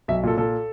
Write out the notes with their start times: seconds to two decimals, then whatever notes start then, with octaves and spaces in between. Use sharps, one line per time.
0.08 B1 E5
0.23 A#2 A4
0.37 A#2 A4